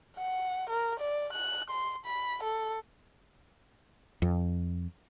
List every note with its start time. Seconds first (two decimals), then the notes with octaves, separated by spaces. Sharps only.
0.17 F#5
0.70 A#4
1.00 D5
1.33 F#6
1.71 C6
2.05 B5
2.43 A4
4.22 F2